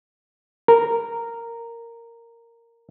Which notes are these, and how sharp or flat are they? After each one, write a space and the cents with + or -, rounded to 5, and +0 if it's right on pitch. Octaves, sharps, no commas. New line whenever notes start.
A#4 -10